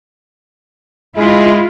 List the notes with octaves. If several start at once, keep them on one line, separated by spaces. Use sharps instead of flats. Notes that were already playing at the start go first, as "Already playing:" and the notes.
G#3 E4 F4